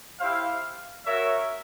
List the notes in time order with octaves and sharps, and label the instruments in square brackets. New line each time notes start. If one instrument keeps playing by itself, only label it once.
[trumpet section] E4 G4 C5 F5
F#4 A#4 C#5 E5